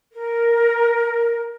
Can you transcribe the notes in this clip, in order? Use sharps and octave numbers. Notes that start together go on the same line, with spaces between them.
A#4